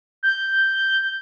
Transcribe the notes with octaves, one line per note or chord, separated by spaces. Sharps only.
G6